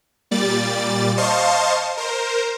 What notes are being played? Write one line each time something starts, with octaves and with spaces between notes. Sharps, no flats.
A#2 G3 D5 A6
C5 D#5 F5 A5 C6 C#6
A#4 C5